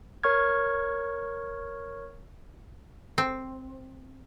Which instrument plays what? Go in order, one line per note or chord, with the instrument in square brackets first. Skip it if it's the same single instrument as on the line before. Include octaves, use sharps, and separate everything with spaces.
[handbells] A#4 C#5 C#6 F6 G#6
[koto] C4